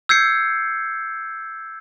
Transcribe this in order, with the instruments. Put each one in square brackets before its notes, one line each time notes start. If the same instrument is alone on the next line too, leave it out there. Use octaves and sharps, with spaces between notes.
[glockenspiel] E6 G6 G#6 C7 C#7